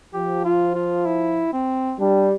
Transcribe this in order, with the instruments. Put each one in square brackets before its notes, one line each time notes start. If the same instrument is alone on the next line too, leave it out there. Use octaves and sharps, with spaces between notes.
[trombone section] F3 [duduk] G4
[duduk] F4
F4
E4
C4
[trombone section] G3 [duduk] D4